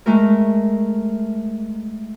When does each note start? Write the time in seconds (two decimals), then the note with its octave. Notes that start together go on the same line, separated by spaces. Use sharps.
0.06 G#3 A3 A#4